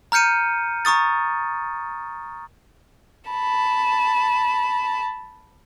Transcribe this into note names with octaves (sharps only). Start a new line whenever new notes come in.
A#5 F6 G6 C#7 D#7
A#5 C#6 D#6 A6
A5 B5